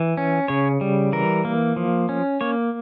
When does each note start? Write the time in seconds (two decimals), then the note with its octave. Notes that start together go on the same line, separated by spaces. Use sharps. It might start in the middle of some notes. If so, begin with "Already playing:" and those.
Already playing: E3
0.17 C#4
0.48 C#3 C#5
0.81 G3
1.12 E3 A#4
1.45 A#3
1.76 F3
2.09 C#4
2.41 A#3 C#5